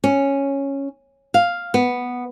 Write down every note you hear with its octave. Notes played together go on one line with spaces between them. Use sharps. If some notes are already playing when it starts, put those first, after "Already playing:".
C#4
F5
B3